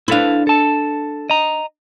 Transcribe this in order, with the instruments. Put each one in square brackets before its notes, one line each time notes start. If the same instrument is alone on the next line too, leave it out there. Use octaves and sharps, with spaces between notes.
[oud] D4 B4 [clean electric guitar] E4 A4 F5
[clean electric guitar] A4 A5
D#5 A#5